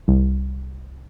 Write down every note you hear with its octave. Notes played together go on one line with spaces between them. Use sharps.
C2